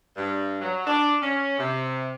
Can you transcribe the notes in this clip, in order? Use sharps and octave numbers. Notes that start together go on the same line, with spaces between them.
G2
F#3
D4
C#4
C3